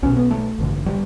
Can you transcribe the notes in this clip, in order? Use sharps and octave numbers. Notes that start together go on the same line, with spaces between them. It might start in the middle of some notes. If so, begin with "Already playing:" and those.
B1 B2 C#4
B3
A3
A1 G2 D3
G3